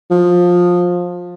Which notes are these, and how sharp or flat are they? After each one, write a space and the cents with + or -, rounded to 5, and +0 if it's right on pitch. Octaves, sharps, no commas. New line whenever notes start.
F3 +20